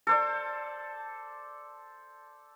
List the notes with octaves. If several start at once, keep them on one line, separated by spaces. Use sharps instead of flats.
A4 C5 D5